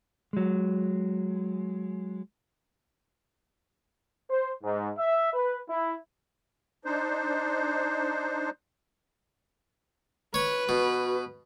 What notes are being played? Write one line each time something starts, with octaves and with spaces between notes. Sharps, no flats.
F#3 G#3
C5
G#2
E5
B4
E4
D4 D#4 C5
B4 C#5 C#6
B2 F#4